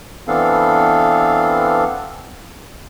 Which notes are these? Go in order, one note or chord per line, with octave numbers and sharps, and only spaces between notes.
E3 B3 C4 D4 A4 F5